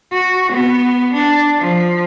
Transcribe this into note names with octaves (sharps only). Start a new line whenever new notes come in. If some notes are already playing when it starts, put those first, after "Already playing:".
F#4
B3
D4
F3